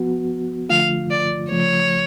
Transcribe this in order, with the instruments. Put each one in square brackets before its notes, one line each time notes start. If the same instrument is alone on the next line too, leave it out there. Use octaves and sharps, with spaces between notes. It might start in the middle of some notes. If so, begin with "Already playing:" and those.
Already playing: [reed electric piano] F3 B3 F#4
[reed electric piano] D3 F3 A3 F4 [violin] F5
[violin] D5
[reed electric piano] C#3 F3 A3 [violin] C#5